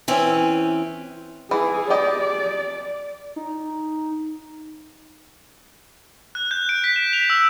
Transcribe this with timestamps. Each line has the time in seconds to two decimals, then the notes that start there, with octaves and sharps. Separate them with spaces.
0.08 E3 C4 C#4
1.51 E3 G#4
1.90 G4 D5 D#5
3.36 D#4
6.35 F#6
6.51 G6
6.69 D7
6.84 B6
6.96 E7
7.13 F7
7.30 E6